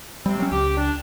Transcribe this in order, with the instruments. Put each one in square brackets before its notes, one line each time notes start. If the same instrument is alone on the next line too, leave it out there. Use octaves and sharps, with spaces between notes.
[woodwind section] C3 C4 [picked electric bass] G3
[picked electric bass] F#3 G#3 C#4
[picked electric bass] C#2 [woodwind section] G4
[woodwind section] D4